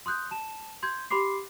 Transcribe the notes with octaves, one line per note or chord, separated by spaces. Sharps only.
C6 D#6 F#6 G6
A5 E7
C6 G6 G#6
G4 B5 C6 D6 C7